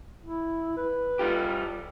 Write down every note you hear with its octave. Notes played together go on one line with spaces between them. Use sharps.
E4
B4
G3 F4 G4